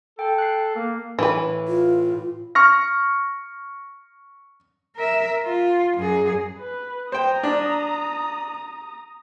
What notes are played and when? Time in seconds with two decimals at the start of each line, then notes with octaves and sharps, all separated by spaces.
0.19 A4 G5
0.38 F#6 C7
0.76 A#3
1.19 A2 E3 B4
1.68 F4
2.55 C#6 F6 A#6
4.96 A#4 E5
5.43 F4
5.97 F#2 G#4
6.59 B4
7.12 C5 G5 A#5 D#6
7.43 D4